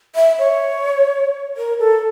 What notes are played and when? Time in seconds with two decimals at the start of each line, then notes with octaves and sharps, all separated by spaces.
0.16 E5
0.39 C#5
1.57 A#4
1.79 A4